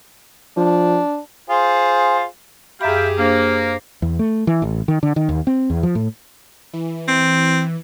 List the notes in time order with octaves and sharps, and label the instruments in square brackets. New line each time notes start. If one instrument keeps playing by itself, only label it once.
[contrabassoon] F3 [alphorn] D4
[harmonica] F4 G#4 C5
[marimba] F#2 B5 [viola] G4 G#4 [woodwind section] E5 F5 G5
[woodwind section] A#3 [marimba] D4 [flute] C5
[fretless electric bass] E2
A3
E3
A1
D#3
D3
D#3
D#2
C4
E2
F3
A2
[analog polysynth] E3
[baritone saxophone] C4